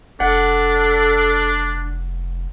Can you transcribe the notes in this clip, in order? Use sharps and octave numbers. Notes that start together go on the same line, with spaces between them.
F1 D4 A4 F#5